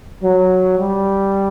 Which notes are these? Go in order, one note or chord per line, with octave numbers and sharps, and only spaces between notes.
F#3
G3